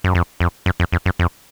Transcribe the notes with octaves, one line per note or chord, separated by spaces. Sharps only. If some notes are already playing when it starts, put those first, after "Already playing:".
F#2
F2
F2
F#2
F2
F2
F#2
F2